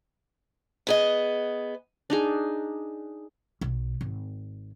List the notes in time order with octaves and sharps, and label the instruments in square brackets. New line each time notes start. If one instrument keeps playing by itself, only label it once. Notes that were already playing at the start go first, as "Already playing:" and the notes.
[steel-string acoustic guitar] B3 G#4 D#5
[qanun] D4 D#4 G#4
[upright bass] B1
G#1